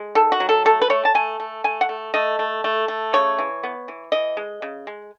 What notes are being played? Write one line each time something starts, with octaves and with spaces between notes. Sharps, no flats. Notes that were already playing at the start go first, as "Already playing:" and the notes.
Already playing: G#3
D#3 A4
F#4
F#3
A4
A3 A4
B4
A3 C#5
A5
A3 G#5
A3
A3 G#5
F#5
A3
A3 D#5
A3
A3
A3
C#3 C#5
E3
B3
E3
E3 D#5
G#3
C#3
G#3